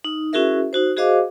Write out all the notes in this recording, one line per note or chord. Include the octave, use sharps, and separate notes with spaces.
D#4
C#4 E4 F#4 G#4 A#4 E5
D#4 F#4 C5
F#4 G#4 C5 D#5 F5 D6